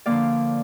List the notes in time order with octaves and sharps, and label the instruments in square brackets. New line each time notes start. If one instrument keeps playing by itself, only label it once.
[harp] D3 F3 A#3 D5 F5